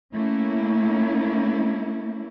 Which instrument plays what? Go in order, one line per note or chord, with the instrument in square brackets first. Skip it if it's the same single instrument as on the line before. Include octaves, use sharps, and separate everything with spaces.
[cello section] A3 A#3 C#4 E4